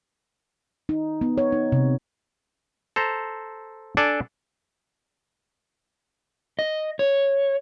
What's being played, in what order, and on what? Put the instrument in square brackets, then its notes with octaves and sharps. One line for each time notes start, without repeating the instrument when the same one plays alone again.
[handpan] D#4
B3
C#5
D#4
C3
[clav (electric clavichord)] A4 C5 A#5
D4 A4 D5 G#5
[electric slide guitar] D#5
C#5